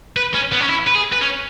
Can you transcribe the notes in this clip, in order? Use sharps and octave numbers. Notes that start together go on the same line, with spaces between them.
B4
C#4
B3
C#4
E4
B4
G#4
B4
C#4